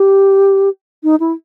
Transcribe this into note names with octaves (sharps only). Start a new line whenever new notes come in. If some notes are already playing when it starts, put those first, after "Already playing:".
Already playing: G4
D#4
E4